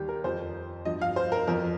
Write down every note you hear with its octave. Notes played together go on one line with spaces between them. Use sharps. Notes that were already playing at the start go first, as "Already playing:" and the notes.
Already playing: D#2 D#3 G3 G4
A#4
F2 F3 C5
G2 F3 D#5
F5
C5
A#4
F2 F3 A#4